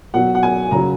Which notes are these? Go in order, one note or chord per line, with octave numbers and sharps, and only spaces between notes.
B2 F#3 F#5
F#5
G#5
C#3 F#3 A#5